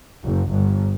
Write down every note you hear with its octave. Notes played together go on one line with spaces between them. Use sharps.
F#1
G1